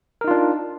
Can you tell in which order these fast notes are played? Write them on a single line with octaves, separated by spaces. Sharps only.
A#4 D#4 F4 D4